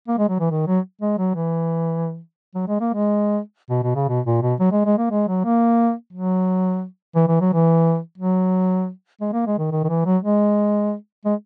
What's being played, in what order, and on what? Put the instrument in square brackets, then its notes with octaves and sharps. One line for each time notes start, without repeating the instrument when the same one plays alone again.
[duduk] A#3
G#3
F#3
E3
D#3
F#3
G#3
F#3
E3
F#3
G#3
A#3
G#3
B2
B2
C#3
B2
A#2
B2
F#3
G#3
G#3
A#3
G#3
F#3
A#3
F#3
E3
E3
F#3
E3
F#3
G#3
A#3
G#3
D#3
D#3
D#3
E3
F#3
G#3
G#3